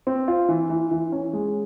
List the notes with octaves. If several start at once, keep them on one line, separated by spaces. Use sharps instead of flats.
C4
F4
E3
E3
E3
C#4
G#3